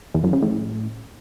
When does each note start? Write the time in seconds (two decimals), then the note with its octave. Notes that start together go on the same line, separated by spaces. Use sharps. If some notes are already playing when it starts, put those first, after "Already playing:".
0.14 E2
0.24 F#2
0.33 C#3
0.42 A2